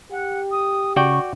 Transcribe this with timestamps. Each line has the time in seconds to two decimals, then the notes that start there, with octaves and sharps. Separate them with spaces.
0.11 G4 F#5
0.51 D#6
0.96 C#3 F#4 D5 G5 C#6